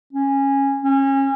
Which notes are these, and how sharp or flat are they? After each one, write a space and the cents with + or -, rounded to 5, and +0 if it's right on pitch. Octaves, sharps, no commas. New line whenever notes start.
C#4 -15
C#4 -30